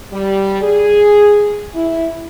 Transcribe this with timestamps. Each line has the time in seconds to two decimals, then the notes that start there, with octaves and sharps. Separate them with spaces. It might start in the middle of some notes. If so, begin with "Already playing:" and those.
0.11 G3
0.62 G#4
1.75 E4